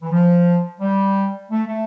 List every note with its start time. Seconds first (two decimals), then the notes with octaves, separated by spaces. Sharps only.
0.02 E3
0.11 F3
0.81 G3
1.50 A3
1.68 A3